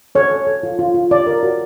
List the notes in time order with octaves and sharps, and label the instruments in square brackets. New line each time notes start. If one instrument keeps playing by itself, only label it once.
[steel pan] A4 C#5
A4
A4
F4
F4
F4
C#5 D5
A#4
F#4